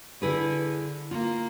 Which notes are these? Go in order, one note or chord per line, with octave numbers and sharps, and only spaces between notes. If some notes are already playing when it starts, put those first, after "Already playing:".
D3 E4 G#4 B4
A#3 F4